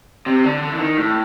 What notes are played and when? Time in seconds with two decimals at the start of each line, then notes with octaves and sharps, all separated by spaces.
0.26 C3
0.44 D3
0.62 D3
0.72 E3
0.80 D#3
0.98 A2